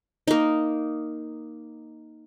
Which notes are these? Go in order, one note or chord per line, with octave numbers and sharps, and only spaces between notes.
A#3 D#4